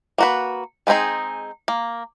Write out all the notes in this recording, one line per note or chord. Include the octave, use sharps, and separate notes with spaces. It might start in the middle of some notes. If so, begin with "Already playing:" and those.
A#3 F#4 B4
G#3 B3 C4 D#4 G#4
A#3